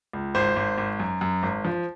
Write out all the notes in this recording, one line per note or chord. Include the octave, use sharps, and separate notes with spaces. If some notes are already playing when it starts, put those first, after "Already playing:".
C#2
G#1 C5
G#1
G#1
F#2
F#2
G#1
F3